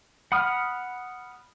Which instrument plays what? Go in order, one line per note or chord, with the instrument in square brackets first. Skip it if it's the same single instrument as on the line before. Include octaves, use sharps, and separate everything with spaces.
[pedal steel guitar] F#5 B5 D#6 F6